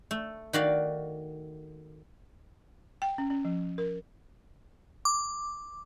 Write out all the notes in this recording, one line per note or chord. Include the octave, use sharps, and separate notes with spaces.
A3
D#3 F#4 D5 F5
G5
C#4
C#4
F3
A#4
D6